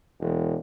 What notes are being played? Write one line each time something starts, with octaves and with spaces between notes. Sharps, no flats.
E1